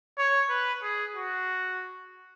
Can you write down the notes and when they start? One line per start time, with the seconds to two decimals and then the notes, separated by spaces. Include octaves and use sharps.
0.18 C#5
0.49 B4
0.82 G#4
1.15 F#4